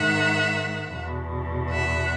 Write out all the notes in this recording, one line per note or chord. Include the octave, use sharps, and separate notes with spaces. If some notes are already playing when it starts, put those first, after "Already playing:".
Already playing: G#2 D#3 E5 F#5
E2 B2
E5 F#5